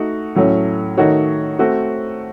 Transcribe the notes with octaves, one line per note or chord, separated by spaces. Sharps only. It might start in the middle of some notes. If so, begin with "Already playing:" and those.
Already playing: A3 D#4 F#4
A2 F#3 A3 C#4
D#3 A3 D#4 F#4 C#5
A3 C4 F#4